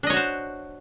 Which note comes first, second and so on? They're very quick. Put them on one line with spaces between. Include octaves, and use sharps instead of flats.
D4 D#5 C#5 F#4 C5